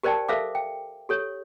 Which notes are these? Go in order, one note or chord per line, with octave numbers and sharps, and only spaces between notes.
G4 A#4 C5 D5 G5 A5
A4 A#4 C5 E5 F5 D6
G5
G4 A4 C#5